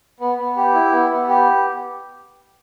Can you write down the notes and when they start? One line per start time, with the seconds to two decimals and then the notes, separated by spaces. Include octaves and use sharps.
0.20 B3
0.38 B3
0.56 G4
0.74 E4
0.92 B3
1.10 B3
1.28 G4